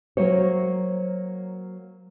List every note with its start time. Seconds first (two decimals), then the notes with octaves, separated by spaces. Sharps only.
0.17 F#3 A#3 C5 C#5